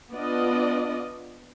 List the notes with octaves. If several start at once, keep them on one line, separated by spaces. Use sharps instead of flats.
B3 D4 F4 D5 D#5